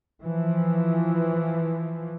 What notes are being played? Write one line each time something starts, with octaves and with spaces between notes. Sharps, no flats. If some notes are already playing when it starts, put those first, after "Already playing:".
E3 F3